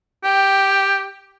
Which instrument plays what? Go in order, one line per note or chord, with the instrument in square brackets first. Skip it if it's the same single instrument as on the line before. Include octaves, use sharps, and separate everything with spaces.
[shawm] G4 [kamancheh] G5